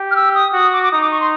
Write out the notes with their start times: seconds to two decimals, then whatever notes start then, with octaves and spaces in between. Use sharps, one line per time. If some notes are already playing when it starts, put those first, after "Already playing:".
Already playing: G4
0.11 F6
0.16 E6
0.35 D#6
0.53 F#4 D#6
0.73 D6
0.83 D6
0.91 D#4 D#6
1.01 D6
1.12 C#6
1.20 C6